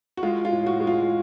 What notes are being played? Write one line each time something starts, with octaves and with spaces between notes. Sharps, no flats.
F#4
G#3 F4
F4
A2
F#4
G#3
F4